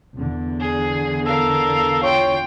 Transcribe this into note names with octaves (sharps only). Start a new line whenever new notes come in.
E2 D3
G#4
A4 A#4 F5
F4 C#5 G5